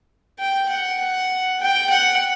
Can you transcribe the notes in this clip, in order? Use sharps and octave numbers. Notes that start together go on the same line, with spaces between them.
G5
F#5
G5
F#5